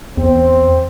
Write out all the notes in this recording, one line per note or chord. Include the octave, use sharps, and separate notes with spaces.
E2 C4